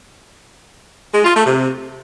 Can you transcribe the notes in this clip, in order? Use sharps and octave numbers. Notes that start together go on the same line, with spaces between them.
G#3
F4
A3
C3